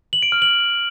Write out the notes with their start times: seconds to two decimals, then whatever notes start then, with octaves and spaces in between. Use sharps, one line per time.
0.13 F#7
0.23 D7
0.32 F6
0.42 F#7